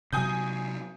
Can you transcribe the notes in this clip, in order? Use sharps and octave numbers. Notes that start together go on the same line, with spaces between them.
C3 F#3 G#5 D#6 G6